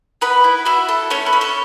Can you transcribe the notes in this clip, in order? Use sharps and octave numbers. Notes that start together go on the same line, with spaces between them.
B3 B4 B5
E4
E4 F#4 E5
A4
A3 C#4 C#5
B4
C#4
A4